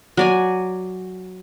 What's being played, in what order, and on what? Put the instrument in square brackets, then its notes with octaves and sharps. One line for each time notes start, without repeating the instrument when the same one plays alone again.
[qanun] F#3 D5 G#5